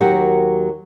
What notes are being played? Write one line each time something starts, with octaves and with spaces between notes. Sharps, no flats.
D#2 F#3 F#4 G4 A#4